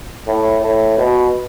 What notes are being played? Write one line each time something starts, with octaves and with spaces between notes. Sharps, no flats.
A2
A2
B2